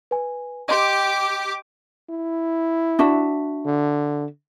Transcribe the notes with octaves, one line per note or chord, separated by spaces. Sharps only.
B4 G#5
G4 D#5 C6 D6
E4
D4 F#4 E5
D3